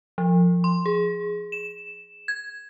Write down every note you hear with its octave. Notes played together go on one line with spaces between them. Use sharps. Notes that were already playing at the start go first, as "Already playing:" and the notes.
F3
C6
G#4
E7
G#6